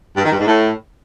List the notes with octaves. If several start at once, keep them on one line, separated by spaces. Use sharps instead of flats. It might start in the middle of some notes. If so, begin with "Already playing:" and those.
G2
D#3
G2
G#2
A2